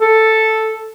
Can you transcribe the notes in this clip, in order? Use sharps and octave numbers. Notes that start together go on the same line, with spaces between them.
A4